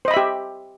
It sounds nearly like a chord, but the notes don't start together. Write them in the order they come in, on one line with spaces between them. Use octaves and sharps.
C5 D#5 B5 E5 G4